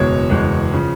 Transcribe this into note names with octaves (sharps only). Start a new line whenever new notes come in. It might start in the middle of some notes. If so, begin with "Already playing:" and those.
Already playing: F#1 E2 B2 G#3 C#5
F#1 E2 B2 G#3
C#3 F3